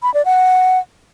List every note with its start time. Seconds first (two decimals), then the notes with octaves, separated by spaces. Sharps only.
0.03 B5
0.14 D5
0.25 F#5